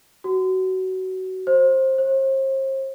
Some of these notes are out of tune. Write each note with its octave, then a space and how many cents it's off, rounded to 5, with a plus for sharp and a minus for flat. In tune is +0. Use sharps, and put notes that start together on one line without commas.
F#4 +20
C5 +20
C5 +40